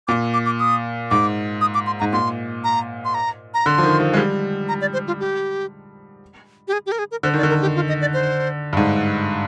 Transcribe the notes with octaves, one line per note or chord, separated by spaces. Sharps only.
A#2 D6
D6
D6
D#6
G#2 D6
D#6
D6
C6
G#2 A#5
A#2 C6
A#5
C6
A#5
A#5
D3 C6
F3
D#3
F3
G#3
G3
A#5
D5
C5
F4
G4
G4
G#4
G4
A#4
G#4
A#4
D3 C5
D#3 D5
D3
A#4
G4
F4
D#5
D5
C5
G2
G#2